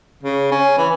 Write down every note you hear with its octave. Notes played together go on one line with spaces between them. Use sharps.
C#3
C#4
E3